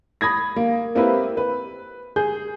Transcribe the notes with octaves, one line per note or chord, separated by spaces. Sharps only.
B5 D#6 G#6 A#6
A#3
A#3 C4 E4 G4 A#4 B4
B4
G#4 G6